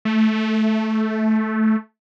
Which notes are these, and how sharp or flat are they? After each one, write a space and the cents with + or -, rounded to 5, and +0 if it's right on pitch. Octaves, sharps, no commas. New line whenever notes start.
A3 -10